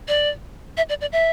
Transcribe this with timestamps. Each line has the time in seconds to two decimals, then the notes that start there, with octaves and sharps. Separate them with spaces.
0.08 D5
0.77 E5
0.89 D5
1.01 D5
1.12 E5